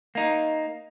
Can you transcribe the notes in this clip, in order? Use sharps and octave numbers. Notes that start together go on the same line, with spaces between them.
A#3 D#4